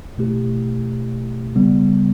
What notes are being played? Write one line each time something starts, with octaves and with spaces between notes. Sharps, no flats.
B2 A3 E4 G4
C#3 G3 B3